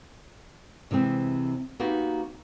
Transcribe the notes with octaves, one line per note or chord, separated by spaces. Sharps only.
C3 E3 G#3 C4
A#3 B3 D#4 F#4 G4